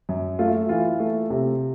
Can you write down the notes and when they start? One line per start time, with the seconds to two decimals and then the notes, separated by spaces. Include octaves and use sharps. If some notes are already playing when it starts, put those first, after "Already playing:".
0.09 F#2
0.39 A3 F4
0.69 E3 F4
1.00 A3
1.30 C3